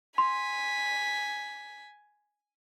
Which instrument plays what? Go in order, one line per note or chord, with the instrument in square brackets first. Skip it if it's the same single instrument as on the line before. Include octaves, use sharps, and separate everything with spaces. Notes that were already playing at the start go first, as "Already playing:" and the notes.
[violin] G#5 B6 [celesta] C6